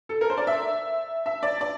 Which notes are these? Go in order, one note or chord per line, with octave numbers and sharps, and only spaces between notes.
A4
A#4
C5
D5
E5
E5
D5
D5